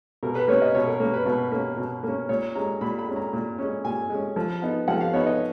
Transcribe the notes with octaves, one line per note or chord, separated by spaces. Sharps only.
B2 A#4
B4
A#3 C#4 C#5
D#5
B2 C#5
A#4
A#3 C#4
B4
B2
A#3 C#4
B2
A#3 C#4
A#2 C#5
G#3 C#4 A#5
A#2 B5
B5
G#3 C#4
A#5
A#2
G#3 C#4
A#2 G#5
G#3 C#4
F3
B3 D#4
F3 F#5
F5
B3 D#4 C#5
D#5